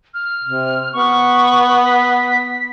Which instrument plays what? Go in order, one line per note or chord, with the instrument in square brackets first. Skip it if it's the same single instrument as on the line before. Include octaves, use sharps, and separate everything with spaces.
[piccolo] F6
[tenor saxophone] C3
[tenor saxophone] B3 [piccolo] C#6
[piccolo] B6